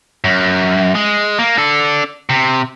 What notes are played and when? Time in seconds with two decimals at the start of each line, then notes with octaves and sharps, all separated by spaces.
0.24 F#2
0.95 G#3
1.39 A#3
1.58 D4 A4
2.29 C3